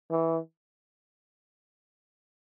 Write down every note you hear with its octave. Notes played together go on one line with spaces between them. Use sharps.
E3